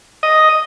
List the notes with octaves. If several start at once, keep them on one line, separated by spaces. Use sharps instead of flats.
D#5